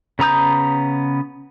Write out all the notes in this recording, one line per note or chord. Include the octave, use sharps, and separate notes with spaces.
C#3 B3 A#5 D#6 G6